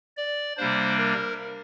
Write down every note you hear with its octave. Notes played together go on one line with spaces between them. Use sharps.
D5
C3 G3 A#3 D4 C5
A#4